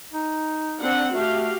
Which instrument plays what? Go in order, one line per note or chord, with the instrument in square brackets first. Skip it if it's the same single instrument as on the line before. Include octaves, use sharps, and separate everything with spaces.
[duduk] D#4
[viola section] C4 D4 F#5
[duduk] A3 [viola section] F#4 G4 F5